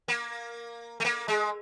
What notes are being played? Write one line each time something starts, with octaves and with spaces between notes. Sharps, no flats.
A#3
A3
A#3
G#3